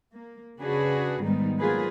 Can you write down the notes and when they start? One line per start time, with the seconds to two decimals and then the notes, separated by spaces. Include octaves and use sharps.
0.13 A#3
0.59 C#3 D4 F#4 G#4 B4
1.20 G#2 D#3 G3 B3 D#4
1.59 F#3 A#3 F4 G#4 B4